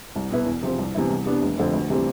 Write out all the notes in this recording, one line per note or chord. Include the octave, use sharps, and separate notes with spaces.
C2
B2 B3 E4 B4
E2
C3 F3 C4
C2
C3 E3 B3 E4
C2
C3 G3 B3 D4
F1
F2 D3 A3 C4
D2
C3 E3 G3 C4